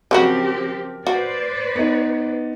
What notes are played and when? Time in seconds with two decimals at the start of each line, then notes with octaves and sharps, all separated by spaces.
0.11 C#3 F3 F#3 C4 F#4 G4 A#4
1.07 F#4 B4 C5 D5
1.75 B3 D#4